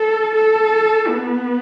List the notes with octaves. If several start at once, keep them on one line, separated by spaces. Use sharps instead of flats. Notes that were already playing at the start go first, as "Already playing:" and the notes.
Already playing: A4
A4
B3